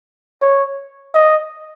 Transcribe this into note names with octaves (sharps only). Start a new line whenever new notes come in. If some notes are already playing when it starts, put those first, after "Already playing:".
C#5
D#5